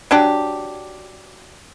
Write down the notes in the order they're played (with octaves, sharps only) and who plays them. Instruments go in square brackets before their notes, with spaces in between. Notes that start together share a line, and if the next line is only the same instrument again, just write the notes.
[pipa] F#3 D4 G4